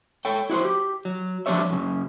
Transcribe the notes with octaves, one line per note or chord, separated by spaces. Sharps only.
A4 C#5 G5
E4 F#4 C5
G4
F#3
F3 B3 D4 G4 C#5 E5
F#2 C#3